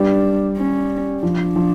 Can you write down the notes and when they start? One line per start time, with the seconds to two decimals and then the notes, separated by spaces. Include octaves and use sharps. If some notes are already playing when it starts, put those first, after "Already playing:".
Already playing: G3 D4
0.58 C#4
1.23 F3 D4
1.56 F3